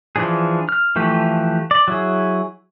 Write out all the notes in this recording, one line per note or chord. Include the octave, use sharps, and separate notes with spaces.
E3 F3 D4 G#4
F6
E3 F3 A3 G4
D5
F#3 E4 G#4